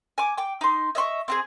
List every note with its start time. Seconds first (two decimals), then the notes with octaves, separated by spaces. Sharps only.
0.18 G#5 D6
0.37 G5 D6
0.61 D#4 C6
0.95 D#5 E5 C6 C#6
1.28 C4 F#4 G#4